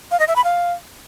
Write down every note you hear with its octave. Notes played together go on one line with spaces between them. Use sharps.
F5
D#5
E5
B5
F5